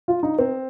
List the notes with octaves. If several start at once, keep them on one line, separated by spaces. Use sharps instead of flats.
F4
D#4
C4